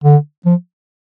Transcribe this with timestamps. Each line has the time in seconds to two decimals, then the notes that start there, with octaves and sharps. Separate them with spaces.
0.04 D3
0.46 F3